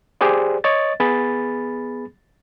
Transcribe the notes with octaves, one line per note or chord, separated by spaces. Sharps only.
G4 G#4 C5 D5
C#5 D#5 A6
B3 G#4 B5 A6